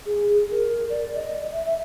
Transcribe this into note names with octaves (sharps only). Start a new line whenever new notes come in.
G#4
G#4
A#4
D5
D#5
E5
E5